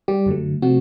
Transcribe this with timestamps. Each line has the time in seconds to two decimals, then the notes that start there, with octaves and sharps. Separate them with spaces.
0.08 G3 G4
0.26 F#2 D3 F#3 A3
0.62 C3 F3 A3 C4 F#4